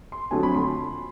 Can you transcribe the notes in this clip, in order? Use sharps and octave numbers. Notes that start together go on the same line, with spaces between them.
C6
F2 D3 F#3 A3 G#5
B5
C6